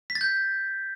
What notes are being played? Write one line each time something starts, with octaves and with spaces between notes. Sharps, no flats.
B6
A6
G6